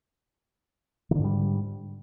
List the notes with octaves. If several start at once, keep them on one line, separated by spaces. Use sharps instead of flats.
G#2 D3 D#3 G3